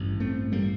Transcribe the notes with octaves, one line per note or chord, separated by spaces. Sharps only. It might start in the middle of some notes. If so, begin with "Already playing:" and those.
Already playing: A1 G2 D3
A3 C4
G3 A#3